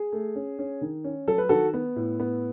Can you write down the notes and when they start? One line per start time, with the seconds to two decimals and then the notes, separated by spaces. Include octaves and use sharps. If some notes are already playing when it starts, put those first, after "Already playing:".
Already playing: G#4
0.12 A3
0.35 C#4
0.59 C#4
0.81 D#3
1.04 C#4
1.27 F#3 A4
1.38 B4
1.49 D#3 F#4 A4
1.74 B3
1.96 A2
2.20 B3